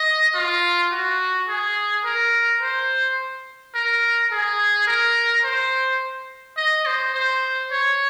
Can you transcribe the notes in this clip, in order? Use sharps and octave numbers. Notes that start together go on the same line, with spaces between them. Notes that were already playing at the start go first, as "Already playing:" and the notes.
Already playing: D#5
F4
F#4
G#4
A#4
C5
A#4
G#4
A#4
C5
D#5
C5
C5
C#5